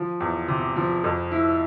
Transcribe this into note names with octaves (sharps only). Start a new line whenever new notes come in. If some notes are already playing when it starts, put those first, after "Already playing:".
Already playing: F3
E2
C3
F3
F2
E4